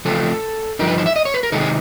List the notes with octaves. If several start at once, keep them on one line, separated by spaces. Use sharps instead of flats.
C#3 F3 A3 C4 F4 A4
G2 D3 F3 D#4 A#4
B4
C5
E5
D#5
C#5
B4
A#4
C3 D#3 G#3 C4 D#4 A4
G#4